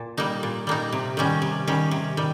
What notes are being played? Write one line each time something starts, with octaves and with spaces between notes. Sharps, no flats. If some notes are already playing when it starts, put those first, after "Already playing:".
Already playing: A#2
G3 A#3 D#4
A#2
G3 A#3 D#4
C3
D#3 G3 C#4
C3
D#3 G3 C#4
C3
D#3 G3